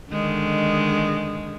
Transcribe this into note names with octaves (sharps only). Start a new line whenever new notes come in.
D3 D#3 G#3